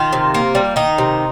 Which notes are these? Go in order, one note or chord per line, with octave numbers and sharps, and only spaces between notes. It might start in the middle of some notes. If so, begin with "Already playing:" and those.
Already playing: D#3 F4
C3
A#3
G3
D#3 D#4
C3